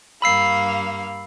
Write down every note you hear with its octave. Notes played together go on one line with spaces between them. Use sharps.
G2 A#3 F5 B5 E6 C7